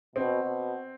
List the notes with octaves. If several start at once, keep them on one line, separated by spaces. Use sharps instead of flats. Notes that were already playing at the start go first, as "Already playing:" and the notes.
B2 C4
B2